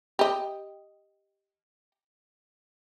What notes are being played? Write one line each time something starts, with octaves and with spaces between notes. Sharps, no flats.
G4 D#5